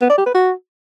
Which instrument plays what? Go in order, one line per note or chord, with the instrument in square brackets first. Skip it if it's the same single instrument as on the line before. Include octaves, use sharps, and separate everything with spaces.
[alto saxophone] B3
D5
G4
B4
F#4